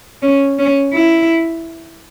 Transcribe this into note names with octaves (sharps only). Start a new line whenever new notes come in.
C#4
C#4
E4